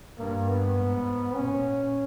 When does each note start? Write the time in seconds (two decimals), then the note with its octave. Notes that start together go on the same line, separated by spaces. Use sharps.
0.18 G2 A#3
0.48 B3
0.77 G#2
1.35 A#2 C#4